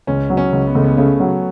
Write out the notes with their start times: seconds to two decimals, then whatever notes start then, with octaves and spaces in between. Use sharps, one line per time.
0.07 C#2 C#4
0.30 F#3
0.37 C#4
0.52 C#2
0.67 B3
0.75 C#2 A3
0.84 B3
0.97 C#3 A3
1.20 F#3